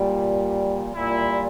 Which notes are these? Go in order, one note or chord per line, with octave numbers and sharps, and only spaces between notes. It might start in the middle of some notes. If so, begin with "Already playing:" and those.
Already playing: A#2 G3
A#2 G3 E4